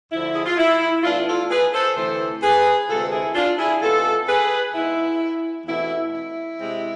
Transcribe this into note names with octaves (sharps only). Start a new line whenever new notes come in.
D2 D3 F3 E4
G#4
F4
E4
A2 E3 B3 D4 F4
F4 A4
G#4 B4
A4 C5
D2 C3 E3 A3 C4 A4 C5
G#4 B4
D2 C3 G#3 C4 F4 A4
E4 G#4
D4 F4
E4 G#4
C3 G#3 B3 F4 A4
G#4 B4
G#2 G#3 B3 E4
E2 B2 A3 C4 E4
E4
C3 G#3 C4